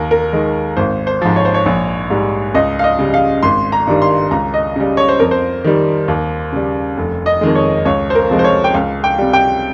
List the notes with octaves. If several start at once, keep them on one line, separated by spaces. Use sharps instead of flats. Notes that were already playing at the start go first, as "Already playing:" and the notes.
Already playing: D#2 A#4
A#4
D#3 G#3
G#1 C5
C5
G#2 F3
C#5
C5
C#5
A#1
G#2 G3
C#2 D#5
F5
D#5
C#3 G3
F5
G#1 C6
A#5
G2 D#3 G3
C6
C#2 A#5
D#5
C#3 G3
C#5
C5
F2 A#4
C5
D#3 G3
D#2
C#3 G3
F1
D#5
F2 D#3 G#3
C#5
C#2 C#5
C5
A#4
C3 F3 G#3
C5
C#5
G5
C#2 F5
G5
C3 G3
G5